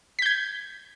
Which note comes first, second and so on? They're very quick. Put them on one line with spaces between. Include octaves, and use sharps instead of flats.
B6 G6 G#6